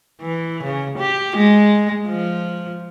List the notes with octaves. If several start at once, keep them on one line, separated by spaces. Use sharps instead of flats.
E3
C#3
G4
G#3
F3